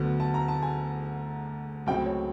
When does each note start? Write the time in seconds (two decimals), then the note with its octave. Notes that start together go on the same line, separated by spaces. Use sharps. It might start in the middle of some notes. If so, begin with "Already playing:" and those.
Already playing: D2 D3 F#3 B3
0.20 A5
0.34 A#5
0.48 A5
0.62 G#5
1.86 C#2 C#3 F#3 A3 C4 G5
2.06 C#5